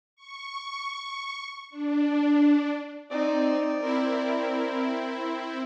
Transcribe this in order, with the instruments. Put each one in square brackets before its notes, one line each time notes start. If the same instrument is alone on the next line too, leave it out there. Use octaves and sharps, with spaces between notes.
[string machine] C#6
D4
[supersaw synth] C4 [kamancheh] D#4 [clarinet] D5
[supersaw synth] C4 E4 [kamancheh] A#4